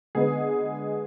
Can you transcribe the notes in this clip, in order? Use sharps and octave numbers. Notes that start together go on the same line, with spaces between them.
D3 G#3 B3 G#4